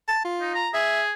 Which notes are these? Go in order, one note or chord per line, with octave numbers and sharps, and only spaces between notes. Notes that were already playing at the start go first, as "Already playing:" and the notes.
A5
F4
D#4
A#5
G#4 E5